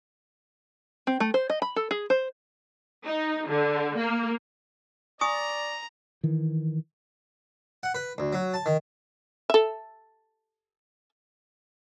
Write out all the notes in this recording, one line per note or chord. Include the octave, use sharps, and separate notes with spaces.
C4
A3
C5
D#5
B5
A4
G#4
C5
D#4
D3
A#3
D5 G#5 A#5 C#6 D#6
D#3 E3
F#5
B4
D2
F#3
A5
D#3
A4 E5